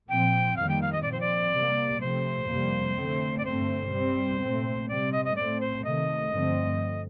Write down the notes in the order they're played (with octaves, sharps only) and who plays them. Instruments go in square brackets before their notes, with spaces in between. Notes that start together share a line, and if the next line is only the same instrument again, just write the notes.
[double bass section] A#2 F3 C4 [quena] G5
[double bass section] F2 D#3 G3 A#3 [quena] F5
[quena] G5
F5
D#5
[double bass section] A#2 F3 C4 [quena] D5
[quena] C5
D5
[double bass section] C3 G3 A#3
[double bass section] C3 F3 A3 C4 [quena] C5
[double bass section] F2 C3 G3 A#3
D3 A3 C4
[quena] D5
[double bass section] G2 D3 A3 C4 [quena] C5
[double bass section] C3 G3 C4
A#2 A3 C4
[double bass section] C3 G3 C4 [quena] D5
[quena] D#5
D#5
[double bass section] A2 A3 C4 [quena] D5
[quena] C5
[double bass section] C3 D#3 A3 [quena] D#5
[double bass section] G2 D3 F3 A3 C4